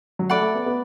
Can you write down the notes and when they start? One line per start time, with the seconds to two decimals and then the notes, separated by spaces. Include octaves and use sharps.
0.19 F#3
0.30 A3 D5 F#5 B5 D6
0.42 A3
0.55 B3
0.66 B3